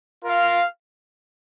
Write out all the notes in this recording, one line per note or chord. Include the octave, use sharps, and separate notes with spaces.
F4 A#4 F5